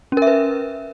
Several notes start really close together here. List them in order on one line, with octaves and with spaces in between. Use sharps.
C#4 A#4 E5 B4